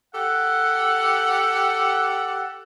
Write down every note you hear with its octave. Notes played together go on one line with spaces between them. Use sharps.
G4 A4 F#5